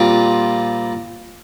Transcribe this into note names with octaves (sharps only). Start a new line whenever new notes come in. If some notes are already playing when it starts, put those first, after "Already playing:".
Already playing: A#2 G3 C4 F4